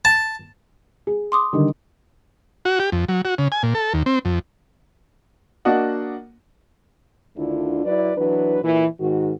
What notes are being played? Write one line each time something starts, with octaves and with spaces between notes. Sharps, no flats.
A5
G#4
C6 D6 D#6
D3 D#3 G3
F#4
G4
F2
F#3
F#4
C#3
G#5
A#2
A4
D#2
C4
F2
A#3 D4 F#4 D#5 F#5
D2 D3 D#3 D4 E4 F4
F#3 E4 B4 D5
E3 F#3 D4 B4
A#2 E3
G#2 D#3 F#4